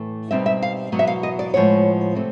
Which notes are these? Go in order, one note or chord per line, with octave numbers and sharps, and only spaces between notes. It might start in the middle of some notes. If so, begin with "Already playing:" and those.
Already playing: A2 E3 A3
B2 G3 C4 D#4 E5
E5
F5
E2 B2 F#3 B3
E5
F5
D#5
D5
A2 F3 G#3 B3 C#5
C3 A3 C4